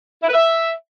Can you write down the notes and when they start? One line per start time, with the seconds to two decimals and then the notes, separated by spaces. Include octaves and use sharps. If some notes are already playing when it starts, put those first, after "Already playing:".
0.23 E4
0.28 B4
0.34 E5